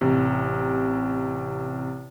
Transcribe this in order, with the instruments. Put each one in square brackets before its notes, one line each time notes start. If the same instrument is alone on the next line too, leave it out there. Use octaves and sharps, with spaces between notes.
[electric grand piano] A1 C3